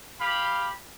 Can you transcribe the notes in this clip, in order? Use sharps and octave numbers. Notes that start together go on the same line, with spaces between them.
G4 F5 B5